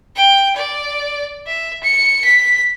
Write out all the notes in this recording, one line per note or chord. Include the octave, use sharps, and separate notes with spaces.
G5
D5
E5
C#7
B6